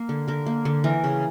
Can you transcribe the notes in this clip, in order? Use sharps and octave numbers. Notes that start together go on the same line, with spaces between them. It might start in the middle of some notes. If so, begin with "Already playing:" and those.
Already playing: A#3
D3
D3 A#4
A#3
D3
E3 A#4
C#3